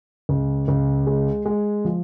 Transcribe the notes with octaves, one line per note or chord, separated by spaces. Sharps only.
C#2
C#2
G#3
G#3
F3